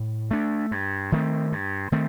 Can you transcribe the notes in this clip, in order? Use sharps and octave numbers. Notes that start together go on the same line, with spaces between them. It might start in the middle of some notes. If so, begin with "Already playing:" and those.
Already playing: A2
A3 D4
G2
D#3 A3 C4
G2
D#3 A3 C4